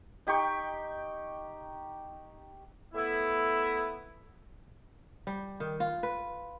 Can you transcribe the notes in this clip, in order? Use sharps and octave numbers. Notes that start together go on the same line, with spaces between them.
D#4 G4 G5 C#6
A3 B3 E4
G3
D#3
F4
B4